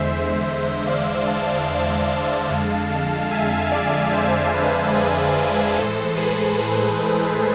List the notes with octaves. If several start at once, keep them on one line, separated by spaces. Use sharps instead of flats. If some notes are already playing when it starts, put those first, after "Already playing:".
Already playing: E2 D3 G#3 C5 E5
D5 F5
F5 A5
F2 D3 G#3
E5 G#5
D5 F5
C5 E5
B4 D5
G#4 B4
G#4 B4
A2 E3 G#3 A4 C5
G#4 B4
G#4 B4